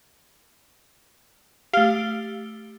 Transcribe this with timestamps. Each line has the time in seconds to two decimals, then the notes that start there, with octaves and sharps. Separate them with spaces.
1.73 A3 G4 F5